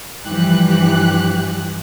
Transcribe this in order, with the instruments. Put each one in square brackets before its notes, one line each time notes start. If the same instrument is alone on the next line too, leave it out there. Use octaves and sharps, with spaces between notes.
[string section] G2 E3 F3 G4 F#6